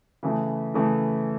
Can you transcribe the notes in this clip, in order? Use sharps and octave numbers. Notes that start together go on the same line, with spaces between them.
C#3 E3 A3
C#3 E3 A3